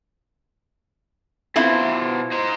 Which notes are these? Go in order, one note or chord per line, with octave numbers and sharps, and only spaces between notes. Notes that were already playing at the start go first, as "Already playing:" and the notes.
B2 C4 E4 F4 C5
D#4 C5